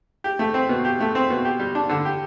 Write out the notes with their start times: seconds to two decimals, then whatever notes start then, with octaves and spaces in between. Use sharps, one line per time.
0.24 G4
0.39 A3
0.54 C4
0.69 B2
0.85 G4
1.00 A3
1.15 C4
1.30 B2
1.45 G4
1.59 G3
1.75 D4
1.89 D3
2.05 G4